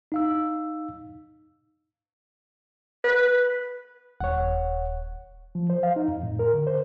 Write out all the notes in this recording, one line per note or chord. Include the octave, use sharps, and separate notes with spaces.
D#4 F5 E6
B4
D#1 C#5 F#5
F3
C5
F5
D#4
F2
A2
A#4
D3
C5